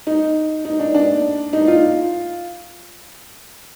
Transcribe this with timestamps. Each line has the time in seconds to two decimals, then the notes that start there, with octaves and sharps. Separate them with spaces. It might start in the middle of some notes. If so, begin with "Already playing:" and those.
0.07 D#4
0.65 D#4
0.79 D4
0.94 D4
1.53 D#4
1.67 F4